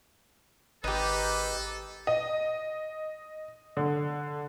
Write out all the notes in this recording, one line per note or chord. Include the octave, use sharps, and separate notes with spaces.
G#1 D#4 G4 A4 B4
D#5
D3